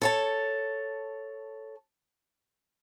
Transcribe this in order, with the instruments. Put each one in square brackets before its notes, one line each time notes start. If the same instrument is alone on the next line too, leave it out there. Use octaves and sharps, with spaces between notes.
[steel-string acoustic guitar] A4 C#5 A5